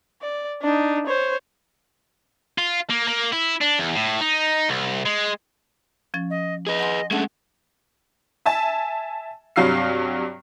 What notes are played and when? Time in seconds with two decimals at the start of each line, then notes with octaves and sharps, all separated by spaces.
0.22 D5
0.62 D4 D#4
1.06 C5 C#5
2.58 F4
2.90 A#3
3.08 A#3
3.33 E4
3.61 D4
3.79 E2
3.95 A2
4.21 D#4
4.69 C2
5.06 G#3
6.14 F3 C#4 A6
6.30 D#5
6.67 G#4 B4 D#5
6.79 F#5 G#5 C6
7.11 G#3 A3 C#4 D4 F#5
8.46 E5 G#5 A5
9.56 G2 C3 F#3 F5 F6 C7